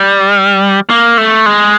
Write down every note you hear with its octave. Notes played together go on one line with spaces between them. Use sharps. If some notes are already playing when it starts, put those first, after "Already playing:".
Already playing: G3
A#3
A3
G#3